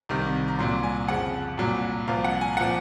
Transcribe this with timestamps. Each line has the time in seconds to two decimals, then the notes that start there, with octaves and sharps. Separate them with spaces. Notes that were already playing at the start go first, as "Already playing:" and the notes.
0.09 C2 C3 D#3
0.48 A#5
0.59 C2 A#2 F#3 C6
0.83 G#5
1.08 F2 C#3 F3 F#5
1.57 C2 A#2 F#3
2.07 C2 A#2 F3 F5
2.24 F#5
2.41 G#5
2.57 A#2 F3 F#5